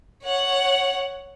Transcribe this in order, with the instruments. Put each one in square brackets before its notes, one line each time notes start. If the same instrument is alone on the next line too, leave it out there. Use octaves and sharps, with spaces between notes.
[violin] C#5 F#5